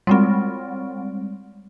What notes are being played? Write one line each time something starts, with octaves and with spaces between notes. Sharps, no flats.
G3 G#3 C4